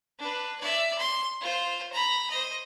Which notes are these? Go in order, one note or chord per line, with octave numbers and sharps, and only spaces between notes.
D4 B4
D5 E5
C6
F4 C5
A#5 B5
C5 D#5